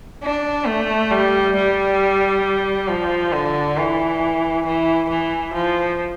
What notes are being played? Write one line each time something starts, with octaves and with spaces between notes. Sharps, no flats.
D4
A3
G3
G3
F3
D3
E3
E3
E3
F3